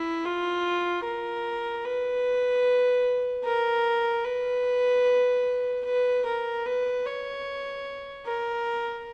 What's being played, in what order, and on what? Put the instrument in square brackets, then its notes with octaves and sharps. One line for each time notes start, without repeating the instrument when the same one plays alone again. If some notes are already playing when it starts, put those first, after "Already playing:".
Already playing: [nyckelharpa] E4
F4
A#4
B4
A#4
B4
B4
A#4
B4
C#5
A#4